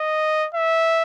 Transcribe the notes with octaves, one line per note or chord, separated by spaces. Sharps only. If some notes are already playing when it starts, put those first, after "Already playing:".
Already playing: D#5
E5